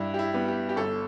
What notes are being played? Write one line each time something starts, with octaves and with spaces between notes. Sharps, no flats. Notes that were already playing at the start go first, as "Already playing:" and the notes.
Already playing: G2 E4
G4
E4
G3 B3
G4
G4
G1 A4